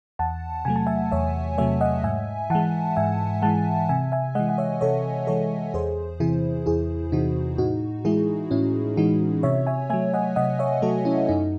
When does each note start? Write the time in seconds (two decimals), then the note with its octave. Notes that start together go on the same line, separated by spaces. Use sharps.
0.19 E2 F#5 A5
0.65 C3 F#3 A3 G#5
0.76 A5
0.87 E5 G#5
1.12 E2 C#5 E5
1.58 C3 F#3 A3 C#5 E5
1.81 D#5 F#5
2.04 G#2 E5 G#5
2.50 E3 G#3 F#5 A5
2.96 G#2 E5 G#5
3.42 E3 G#3 F#5 A5
3.89 C3 E5 G#5
4.12 E5 G#5
4.35 E3 G#3 D#5 F#5
4.49 F#5
4.58 C#5 E5
4.81 C3 A4 C#5
5.27 E3 G#3 A4 C#5
5.74 E2 G#4 C5
6.20 C3 E3 E4 G#4
6.66 E2 E4 G#4
7.12 C3 E3 D#4 F#4
7.58 A2 D#4 F#4
8.05 E3 G#3 E4 G#4
8.51 A2 C#4 E4
8.97 E3 G#3 D#4 F#4
9.43 C3 C#5 E5
9.67 E5 G#5
9.90 F#3 A3 E5 G#5
10.14 D#5 F#5
10.36 C3 D#5 F#5
10.59 C#5 E5
10.82 F#3 A3 F#4 A4
11.05 C#4 E4
11.29 F#2 D#4